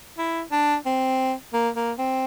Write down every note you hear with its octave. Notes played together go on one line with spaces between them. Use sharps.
E4
D4
C4
A#3
A#3
C4